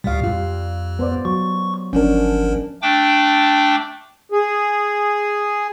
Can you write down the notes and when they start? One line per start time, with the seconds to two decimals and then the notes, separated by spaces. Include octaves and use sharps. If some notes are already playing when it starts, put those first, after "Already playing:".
0.04 D2 A#2 G3 F5
0.24 F2 G3 F4
0.99 B3 C5 D5
1.25 F#3 C#6
1.93 G1 F3 C#4 D4 A#4
2.82 A3 D4 G5 D6
4.32 G#4